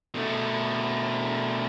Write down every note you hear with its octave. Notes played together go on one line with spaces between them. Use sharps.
B2 A3